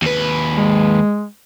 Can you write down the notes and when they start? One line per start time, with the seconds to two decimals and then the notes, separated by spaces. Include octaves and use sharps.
0.02 D#2 B4
0.57 G#3